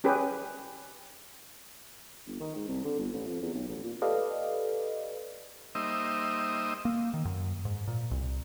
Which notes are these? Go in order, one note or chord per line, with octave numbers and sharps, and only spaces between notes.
C#4 G4 G#4 B4
G1
D#3
G#2
C2
D3
G1
A1
F2
E2
B1
A1
A#2
G4 A4 B4 D5 D#5 F5
G3 A#3 D#4 C5 D#5 E5
A#3
D#3
F#2
G#2
A#2
C2